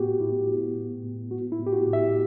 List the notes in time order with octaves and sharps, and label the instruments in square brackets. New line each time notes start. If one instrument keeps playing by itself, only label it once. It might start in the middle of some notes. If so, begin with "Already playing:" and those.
Already playing: [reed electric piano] A2 B3 F#4 G4
A2 E4
B3
A2
A2
B3 F#4
E4
A2
G4
F#4
A2
E5